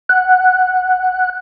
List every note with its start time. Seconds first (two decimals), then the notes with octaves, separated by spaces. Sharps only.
0.09 F#5